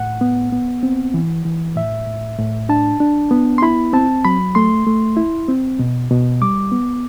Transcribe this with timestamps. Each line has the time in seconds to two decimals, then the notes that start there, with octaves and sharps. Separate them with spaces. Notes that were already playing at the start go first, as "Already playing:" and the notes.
Already playing: A2 F#5
0.21 B3
0.52 B3
0.83 C4
1.14 E3
1.45 E3
1.76 A2 E5
2.07 A2
2.39 A2
2.69 D4 A5
3.00 D4
3.31 B3
3.58 C6
3.62 E4 B5
3.93 C4 A5
4.25 F#3 B5
4.55 A3 C6
4.87 A3
5.17 E4
5.48 C4
5.79 B2
6.11 B2
6.42 G3 D6
6.72 B3